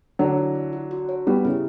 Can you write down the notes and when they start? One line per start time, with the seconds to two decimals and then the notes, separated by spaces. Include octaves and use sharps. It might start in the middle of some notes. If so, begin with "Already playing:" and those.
0.19 D3 F#3 D5
0.38 E4
0.55 D5
0.73 F#4
0.91 F#4
1.09 C#5
1.27 G3 B3 G4
1.45 C#3 E4